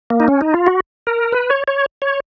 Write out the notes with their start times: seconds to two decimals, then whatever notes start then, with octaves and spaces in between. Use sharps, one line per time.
0.10 A#3
0.20 D#4
0.28 C#4
0.41 D#4
0.54 F4
0.67 F#4
1.07 A#4
1.32 B4
1.50 C#5
1.68 C#5
2.02 C#5